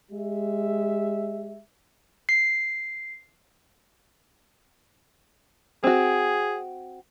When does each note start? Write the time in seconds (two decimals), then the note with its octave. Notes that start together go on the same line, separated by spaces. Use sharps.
0.11 G#3 G4 E5
2.29 C7
5.84 C4 F#4 G#4